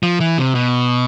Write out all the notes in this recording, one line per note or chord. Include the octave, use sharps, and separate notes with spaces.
F3
E3
C3
B2